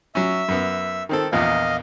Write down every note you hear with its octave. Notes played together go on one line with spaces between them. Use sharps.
F#3 C#4 E5 E6
F#2 B3
D#3 C4 A4
A#1 E2 A#2 D#5 F5